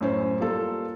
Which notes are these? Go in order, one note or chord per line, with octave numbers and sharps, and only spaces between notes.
F#2 A2 C#4 C5
G3 A#3 F4 A4